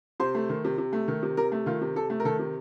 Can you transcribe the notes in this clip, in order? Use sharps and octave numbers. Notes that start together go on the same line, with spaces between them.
C3 C5
A3
D#3
C3
C3
A3
D#3
C3
C3 A#4
A3
D#3 F4
C3
C3 A4
A3
A#4
D#3 A4
C3